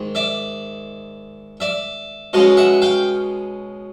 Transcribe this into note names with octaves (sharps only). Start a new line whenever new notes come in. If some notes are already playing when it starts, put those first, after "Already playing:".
Already playing: G#2 D#3
D5 E5
D5 E5
B2 G#3 C#4 D#5 F5
E5 F#5
F5 G5